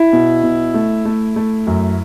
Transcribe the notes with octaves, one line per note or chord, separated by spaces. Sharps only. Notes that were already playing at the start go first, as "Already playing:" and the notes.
Already playing: E4
B2
B2
A3
A3
A3
F#2